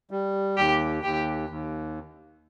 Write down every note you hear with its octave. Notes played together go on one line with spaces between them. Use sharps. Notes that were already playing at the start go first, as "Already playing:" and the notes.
G3
D#2 G4
D#2 G4
D#2